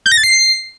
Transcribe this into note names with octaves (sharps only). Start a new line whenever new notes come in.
G6
A#6
A6
C7